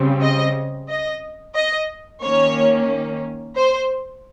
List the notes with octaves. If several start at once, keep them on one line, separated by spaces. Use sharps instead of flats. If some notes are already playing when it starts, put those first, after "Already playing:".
Already playing: C#3 G3 C4
D#5
D#5
D#5
D#3 A#3 C#4 C#5
C5